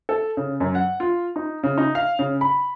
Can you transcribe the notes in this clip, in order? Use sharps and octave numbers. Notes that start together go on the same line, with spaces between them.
A4
C#3
F#2
F#5
F4
D#4
C#3
D#4
F5
C#3
B5